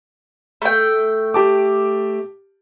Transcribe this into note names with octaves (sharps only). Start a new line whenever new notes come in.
A3 G5
G4 A5 D6